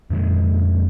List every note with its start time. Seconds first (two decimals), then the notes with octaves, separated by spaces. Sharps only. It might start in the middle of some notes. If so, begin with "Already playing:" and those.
0.10 F2 A#2 D#3 G#3